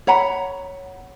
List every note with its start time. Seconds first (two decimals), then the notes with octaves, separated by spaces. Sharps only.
0.07 C#5 F#5 A#5 B5